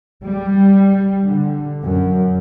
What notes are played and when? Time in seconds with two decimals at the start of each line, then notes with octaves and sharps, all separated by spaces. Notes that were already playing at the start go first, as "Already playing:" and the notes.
0.24 G3
1.25 D3
1.83 F#2